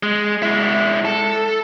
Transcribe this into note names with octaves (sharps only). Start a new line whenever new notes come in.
G#3
G#3 E4
A4